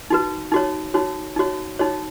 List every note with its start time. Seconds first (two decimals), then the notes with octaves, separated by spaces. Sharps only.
0.10 D#4 F#4 B4
0.52 D#4 F#4 C#5
0.94 D#4 F#4 C#5
1.36 D#4 F#4 C#5
1.79 D#4 F#4 C#5